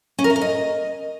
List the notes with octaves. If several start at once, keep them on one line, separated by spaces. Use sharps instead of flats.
C#4
A#4
E5
A#4
D#5